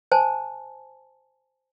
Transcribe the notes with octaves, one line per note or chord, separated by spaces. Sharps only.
C5 G#5 A5